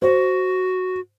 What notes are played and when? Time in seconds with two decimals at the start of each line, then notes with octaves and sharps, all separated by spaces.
0.02 F#4 C5